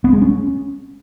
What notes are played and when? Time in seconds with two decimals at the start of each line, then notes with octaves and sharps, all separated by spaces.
0.04 B3
0.13 G#3
0.22 C#4